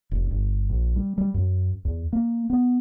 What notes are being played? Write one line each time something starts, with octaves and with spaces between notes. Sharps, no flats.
F1
G1
A#1
G3
G3
F#2
E2
A#3
B3